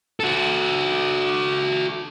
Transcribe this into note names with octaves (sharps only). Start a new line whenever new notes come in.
F#4 A4